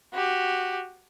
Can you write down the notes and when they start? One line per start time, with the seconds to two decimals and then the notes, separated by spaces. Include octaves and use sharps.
0.14 F#4 G4